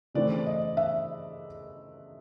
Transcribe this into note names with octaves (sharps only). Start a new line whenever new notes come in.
C#3 E3 A3 C4 D5
D#5
E5